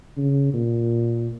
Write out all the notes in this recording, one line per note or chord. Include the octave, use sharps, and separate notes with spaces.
C#3
A#2